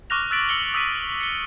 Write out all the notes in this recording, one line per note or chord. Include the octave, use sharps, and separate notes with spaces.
C#6 D6 F6 F#6 A#6 F7
E6 F#6 A6 B6 D7 F#7
E6 F6 C#7 F#7 G7
D#6 E6 F#6 B6 D#7
C#7 G7